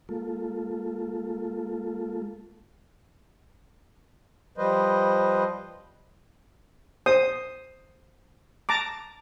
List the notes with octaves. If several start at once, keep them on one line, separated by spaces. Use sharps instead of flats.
G#3 A#3 F4 A4
F3 G3 B4 C5 D#5
C5 D#6
A5 A#5 D6